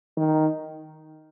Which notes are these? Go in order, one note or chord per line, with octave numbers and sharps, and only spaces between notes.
D#3